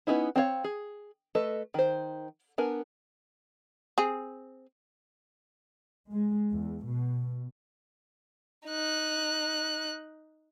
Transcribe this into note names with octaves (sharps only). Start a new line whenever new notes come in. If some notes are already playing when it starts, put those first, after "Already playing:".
B3 C#4 D#4 E4
C4 D4 C#5 F5
G#4
A3 A4 B4 D#5
D#3 C5
B3 D4 A#4 G#5
C4 G#4
G#3
E2
B2
D#4 F#6